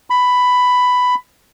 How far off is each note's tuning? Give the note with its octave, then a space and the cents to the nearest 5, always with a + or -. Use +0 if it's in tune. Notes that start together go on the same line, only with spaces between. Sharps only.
B5 +10